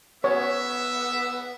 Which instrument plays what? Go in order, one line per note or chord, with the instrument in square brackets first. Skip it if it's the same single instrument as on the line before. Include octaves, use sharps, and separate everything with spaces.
[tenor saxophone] B3 [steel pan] C#5 [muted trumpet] E5